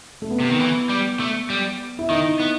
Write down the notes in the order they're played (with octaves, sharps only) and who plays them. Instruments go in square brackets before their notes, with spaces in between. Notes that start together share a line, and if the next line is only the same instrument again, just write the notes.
[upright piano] A3
B3
[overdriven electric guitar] C3
D#3
E3
G3
A3
G3
[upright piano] E4
[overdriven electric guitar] D#3 [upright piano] D#4
[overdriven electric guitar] B3